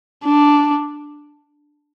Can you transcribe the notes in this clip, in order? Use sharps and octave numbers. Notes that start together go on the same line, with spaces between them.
D4